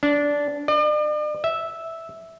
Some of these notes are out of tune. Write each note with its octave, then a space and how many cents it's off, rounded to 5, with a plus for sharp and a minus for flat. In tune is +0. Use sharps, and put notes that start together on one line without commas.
D4 -15
D5 +45
E5 -5